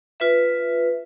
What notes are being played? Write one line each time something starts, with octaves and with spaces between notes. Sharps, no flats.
F4 B4 E5